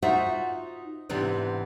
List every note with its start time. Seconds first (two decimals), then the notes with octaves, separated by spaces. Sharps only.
0.02 D#4 F4 F#4 C5 E5
1.09 G#2 C3 E3 B3 D4